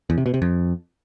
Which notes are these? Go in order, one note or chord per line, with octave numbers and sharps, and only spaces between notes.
E2
C3
B2
C3
F2